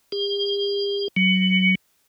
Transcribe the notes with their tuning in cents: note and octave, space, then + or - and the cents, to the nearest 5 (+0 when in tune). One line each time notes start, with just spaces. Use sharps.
G4 +45
F#3 +20